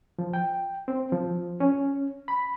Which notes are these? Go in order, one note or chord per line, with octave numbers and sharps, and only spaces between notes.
F3
G5
C4
F3
C#4
B5